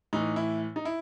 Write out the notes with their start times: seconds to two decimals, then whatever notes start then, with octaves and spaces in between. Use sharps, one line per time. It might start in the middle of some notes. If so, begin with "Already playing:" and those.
0.13 A2 E3 D#4
0.36 E4
0.76 D#4
0.85 E4